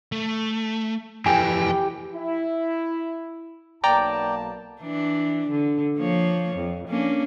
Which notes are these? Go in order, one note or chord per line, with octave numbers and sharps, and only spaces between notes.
A3
F2 E3 G4 G5 G#5
E4
B1 A#3 D5 G5 A5 A#5
E3 D4
D3
F3 A#3 C#5
F2
A#3 C#4 D4